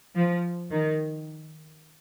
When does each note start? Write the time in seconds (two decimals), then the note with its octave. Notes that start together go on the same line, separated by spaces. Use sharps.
0.15 F3
0.71 D#3